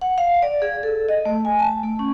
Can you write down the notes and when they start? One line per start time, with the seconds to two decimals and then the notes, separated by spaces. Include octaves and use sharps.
0.01 F#5
0.18 F5
0.42 D5
0.62 G#4
0.83 A4
1.09 D#5
1.25 A3
1.45 G#5
1.59 A5
1.83 A3
1.99 C#4